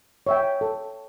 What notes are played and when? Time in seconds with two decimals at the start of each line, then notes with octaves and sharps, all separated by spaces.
0.27 C#5 E5 G5
0.61 A4